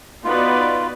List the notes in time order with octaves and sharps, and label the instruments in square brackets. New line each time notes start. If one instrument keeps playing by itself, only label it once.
[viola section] B3 D#4 F#4 B4 D5 [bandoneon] F4